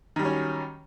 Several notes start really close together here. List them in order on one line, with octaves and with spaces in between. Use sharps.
D#3 G3 F#3 C#4